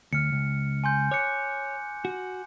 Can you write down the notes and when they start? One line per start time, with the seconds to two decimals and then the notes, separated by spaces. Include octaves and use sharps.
0.13 D2 F6 C#7
0.32 C#2
0.84 G#5 C6 G6
1.11 C#5 D6 F#6 C#7
2.05 F#4